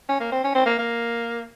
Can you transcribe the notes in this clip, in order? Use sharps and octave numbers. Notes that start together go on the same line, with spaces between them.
C#4
A#3
C4
C#4
C4
A#3
A#3